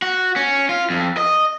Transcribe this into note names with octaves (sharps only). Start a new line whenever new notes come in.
F#4
C#4
F4
F2
D#5